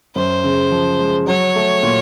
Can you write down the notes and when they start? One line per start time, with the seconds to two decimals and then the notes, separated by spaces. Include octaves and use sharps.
0.15 F#2 C5
0.44 C#3
0.71 F3
0.99 G#3
1.27 F#3 C#5
1.56 A3
1.83 A#2